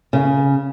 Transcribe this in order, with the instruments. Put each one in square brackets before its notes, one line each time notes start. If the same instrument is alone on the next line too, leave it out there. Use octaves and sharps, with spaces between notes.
[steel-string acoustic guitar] C#3